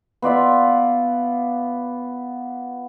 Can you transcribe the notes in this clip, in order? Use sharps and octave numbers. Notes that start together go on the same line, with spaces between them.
B3 F4 D5 E5